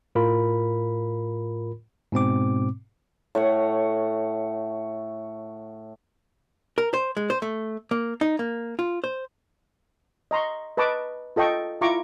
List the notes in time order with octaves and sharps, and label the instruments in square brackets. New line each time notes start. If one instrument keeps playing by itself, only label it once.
[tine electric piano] A2 F4 A#4 B5
G#2 B2 C4 D6
[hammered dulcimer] A2 C#5 F#5
[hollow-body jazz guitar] A#4
C5
G#3
C5
A3
A#3
D#4
A#3
F4
C5
[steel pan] D#5 A#5 C6 C#6
B4 D#5 A5 C#6 D6
F4 A4 D#5 G5 C#6
E4 F4 A#5 C#6 D6